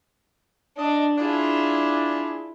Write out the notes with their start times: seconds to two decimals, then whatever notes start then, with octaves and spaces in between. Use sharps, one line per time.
0.77 D4 D#5
1.18 D4 E4 F4 G#4